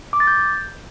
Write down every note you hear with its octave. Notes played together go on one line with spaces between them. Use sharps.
D6
A6
G6